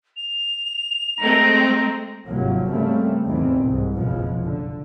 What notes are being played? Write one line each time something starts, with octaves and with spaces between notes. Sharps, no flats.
F7
G#3 A3 C4 A#5
G#1 C3 F3 F#3 A#3
C#3 G3 A3 A#3 C4
E2 A2 C3 D#3 E3 C4
C2 G#2
F#1 B1 F2 B2 F3 G#3
D3